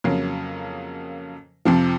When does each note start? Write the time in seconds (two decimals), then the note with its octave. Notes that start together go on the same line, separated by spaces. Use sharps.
0.04 F2 C#3 F#3 A#3
1.65 F2 C3 F3